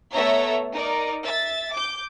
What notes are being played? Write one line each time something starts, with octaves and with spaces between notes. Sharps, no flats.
A3 B3 A4 C#5 E5 A#5
D#4 A#4 D5 A#5
E5 A6
D6 G6